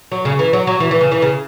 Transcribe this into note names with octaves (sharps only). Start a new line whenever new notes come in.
F#3
C#3
E3
F#3
F#3
E3
E3
C#3
E3
C#3